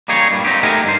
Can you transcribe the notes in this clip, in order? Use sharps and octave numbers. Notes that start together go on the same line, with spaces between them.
G3 A#3 D#4 G#4 C#5
G2 A#2 G3
F#3 C4 D#4 G4
A3 B3 D#4 G4 A#4 G#5
G2 C5